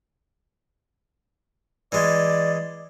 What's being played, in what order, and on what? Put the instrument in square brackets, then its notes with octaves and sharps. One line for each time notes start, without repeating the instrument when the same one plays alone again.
[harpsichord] E3 G#3 [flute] D5